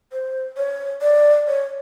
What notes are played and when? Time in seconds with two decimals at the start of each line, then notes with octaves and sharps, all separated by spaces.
0.13 C5
0.57 C#5
1.02 D5
1.47 C#5